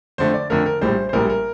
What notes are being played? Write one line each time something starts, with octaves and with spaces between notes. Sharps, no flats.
F2 D3 A3 C5
D5
F2 D3 A3 A#4
A#4
A#1 A2 G3 C5
C5
A#1 A2 G3 A#4
A#4